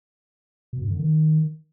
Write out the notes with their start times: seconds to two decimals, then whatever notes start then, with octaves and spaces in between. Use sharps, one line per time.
0.73 B2
0.82 G2
0.90 D3
0.99 D#3